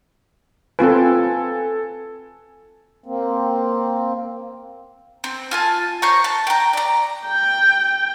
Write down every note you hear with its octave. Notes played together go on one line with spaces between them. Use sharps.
C4 F4 A4 B4 G#5
A#3 C4
C4
F4 G#5 A5
C5 C#5 A#5 C#6
A5
G5 A#5
D5 A#5
G5